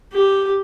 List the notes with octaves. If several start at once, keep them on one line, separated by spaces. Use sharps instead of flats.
G4